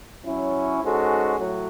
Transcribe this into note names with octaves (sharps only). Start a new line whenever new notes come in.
F#3 C#4 E4
G#2 G#3 C#4 F#4 A4
A2 F#3